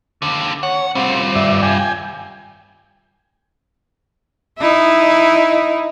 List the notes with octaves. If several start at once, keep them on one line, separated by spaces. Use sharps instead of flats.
D#2 D3
C#5 F#5
G3 C4 F4
G2 D5 E5
G5 G#5
D#4 E4